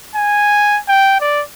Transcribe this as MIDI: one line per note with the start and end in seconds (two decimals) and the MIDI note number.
0.15 0.79 80
0.88 1.16 79
1.21 1.42 74